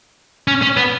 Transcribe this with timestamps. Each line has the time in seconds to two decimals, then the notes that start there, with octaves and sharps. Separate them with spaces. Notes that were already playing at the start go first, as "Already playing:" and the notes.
0.48 C#4
0.62 C#4
0.77 B3